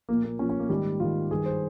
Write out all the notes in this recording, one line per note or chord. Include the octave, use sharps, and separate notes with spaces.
A#2 F3 A#3
A#3
A#2 F3 C#4
C#4
A#3
G#2 D#3 G3
G#2 D#3 F4
G2 D#3 G#4
C5